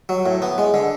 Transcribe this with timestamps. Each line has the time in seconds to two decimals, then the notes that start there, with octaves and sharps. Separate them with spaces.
0.09 F#3
0.26 A2
0.42 B3
0.58 G#3
0.74 D3